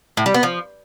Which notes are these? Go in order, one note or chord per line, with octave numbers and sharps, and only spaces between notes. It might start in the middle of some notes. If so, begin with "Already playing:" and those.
A2
G3
B3
F3